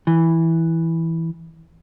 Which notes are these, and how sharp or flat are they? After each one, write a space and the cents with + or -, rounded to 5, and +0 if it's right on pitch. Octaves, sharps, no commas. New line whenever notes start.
E3 -5